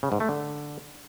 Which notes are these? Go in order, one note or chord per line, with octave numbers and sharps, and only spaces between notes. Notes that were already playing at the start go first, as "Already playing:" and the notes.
C#3
G#2
A3
D3